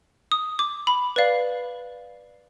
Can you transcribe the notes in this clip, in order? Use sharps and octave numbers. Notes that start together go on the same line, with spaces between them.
D#6
D6
B5
B4 D5 F5